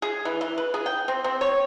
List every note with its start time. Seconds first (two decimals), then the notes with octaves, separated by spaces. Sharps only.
0.02 G#4
0.25 E3
0.41 E3
0.58 B4
0.74 G#4
0.86 G5
1.08 C4
1.24 C4
1.41 C#5